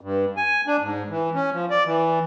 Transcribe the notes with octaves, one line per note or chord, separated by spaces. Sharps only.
G2
G#5
D4
G#2
E3
C#4
F3
D5
E3